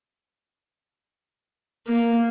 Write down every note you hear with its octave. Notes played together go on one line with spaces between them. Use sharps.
A#3